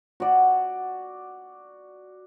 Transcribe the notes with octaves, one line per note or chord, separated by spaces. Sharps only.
F#4 D5